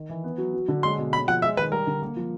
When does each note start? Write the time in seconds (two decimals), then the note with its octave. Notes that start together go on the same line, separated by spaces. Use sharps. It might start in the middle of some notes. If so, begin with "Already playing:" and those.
Already playing: D#3
0.09 E3
0.24 B3
0.38 F#3
0.53 F#3
0.68 D3
0.83 G#3 C6
0.98 B2
1.13 G#3 B5
1.28 F3 F#5
1.42 G#3 E5
1.57 D#3 B4
1.72 G3 A#4
1.87 D3
2.02 A#3
2.16 F3